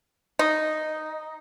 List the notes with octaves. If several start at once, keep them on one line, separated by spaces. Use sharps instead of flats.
D#4